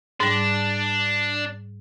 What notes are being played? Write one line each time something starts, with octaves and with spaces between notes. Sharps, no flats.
G#2 G3 D4